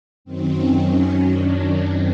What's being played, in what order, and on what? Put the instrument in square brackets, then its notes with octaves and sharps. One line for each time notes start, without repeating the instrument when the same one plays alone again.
[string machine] F#2 D#3 F#3 C4
C#4
D4
C4